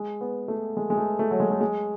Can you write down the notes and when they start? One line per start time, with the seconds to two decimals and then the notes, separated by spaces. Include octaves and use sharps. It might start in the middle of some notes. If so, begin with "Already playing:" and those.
Already playing: G#3
0.21 B3
0.48 A3
0.77 G#3
0.90 G#3
0.97 A3
1.19 A3
1.31 F#3
1.40 G#3
1.51 A3
1.61 G#3